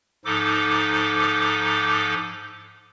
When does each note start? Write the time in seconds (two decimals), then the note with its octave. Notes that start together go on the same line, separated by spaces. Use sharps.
0.25 G#2 F3 D#4 A4 D6